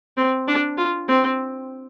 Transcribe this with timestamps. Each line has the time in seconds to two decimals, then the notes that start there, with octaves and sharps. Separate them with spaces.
0.17 C4
0.48 D4
0.78 F4
1.08 C4